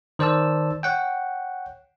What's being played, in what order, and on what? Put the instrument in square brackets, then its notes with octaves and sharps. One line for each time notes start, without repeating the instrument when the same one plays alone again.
[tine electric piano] D#3 C5 D5 A5 E6
C#5 F#5 G5